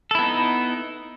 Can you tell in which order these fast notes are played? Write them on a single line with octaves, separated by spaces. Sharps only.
A4 E4 B3 D#4